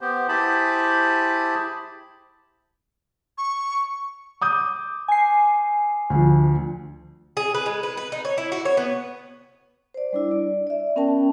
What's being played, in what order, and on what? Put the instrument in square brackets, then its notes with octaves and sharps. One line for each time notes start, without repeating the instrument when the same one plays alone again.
[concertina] B3 G4 C5
E4 G4 G#4 C5 A5 B5
[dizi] C#6
[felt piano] D6 D#6 G6
[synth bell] G#5 C7
[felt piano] D2 F3
[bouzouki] G#4
B4
G#3
B4
B4
D#4
C#5
E4
F#4
C#5
B3
[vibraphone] C5 D5
G3 D4 E4
D5
D5 E5
B3 C#4 A#4 G5 A5